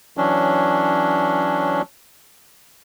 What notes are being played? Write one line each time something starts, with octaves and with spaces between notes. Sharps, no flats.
E3 F#3 C#4 D4